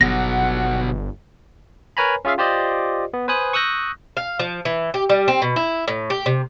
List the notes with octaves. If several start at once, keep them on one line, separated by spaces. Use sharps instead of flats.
G1 B2 F#3 F#5 A#6
A#4 B4 C#5 G#5 A#5 B5
C#4 F4 G#4 E5 F5
F4 G4 C5 D5 D#5
B3
B4 C5 G#5 D#6 F#6
C#6 D#6 E6 F#6 G6 A#6
F5
F3
E3
G4
G3
C4
B2
E4
A2
G4
C3